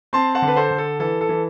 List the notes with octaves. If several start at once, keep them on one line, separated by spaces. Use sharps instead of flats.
C4 A5 C6
F#5 A5
D3
B4
A4 C5
D3
A4
E3 A4
A4
E3